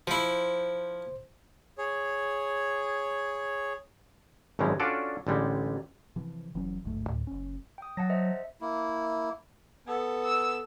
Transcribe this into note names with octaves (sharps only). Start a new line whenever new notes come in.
F3 E4 C5
G#4 C#5
G#1 F#2 B2 G3 G#3
C#4 D4 F4 F#4 A4 D5
A1 D3 G3 G#3
C3 E3 F3
F1 E3 F#3 C#4
D1 A1 G#2 A3
D2 A2
F#1 C#4
G5 D#6
F#3 F#5 A5 A#6
C5 D#5 E5
A#3 E4
B3 A4
E6